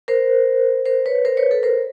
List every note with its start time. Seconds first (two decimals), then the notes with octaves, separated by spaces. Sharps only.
0.08 A#4 C5
0.85 A#4 C5
1.06 B4 C#5
1.25 A#4 C5
1.37 B4 C#5
1.51 A4 B4
1.63 A#4 C5